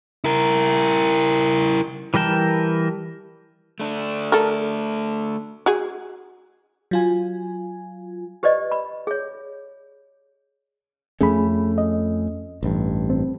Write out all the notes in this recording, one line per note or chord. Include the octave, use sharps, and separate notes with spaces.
E4 A#4
E3 G3 A#4 G5 A5
A3 D4
A4 A#4
F#4 G#4
F#3 F4 G#5
G4 B4 C5 D5 D#5
B5
G#4 C#5
F2 A3 C#4 G#4 B5
D#5
A1 G2
C4